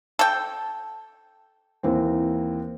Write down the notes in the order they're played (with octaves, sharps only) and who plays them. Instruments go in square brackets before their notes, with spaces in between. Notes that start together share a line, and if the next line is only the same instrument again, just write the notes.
[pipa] A4 G5
[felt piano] D#2 E3 C4